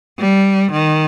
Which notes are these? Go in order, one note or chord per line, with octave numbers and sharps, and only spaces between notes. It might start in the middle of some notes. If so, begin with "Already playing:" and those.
G3
D#3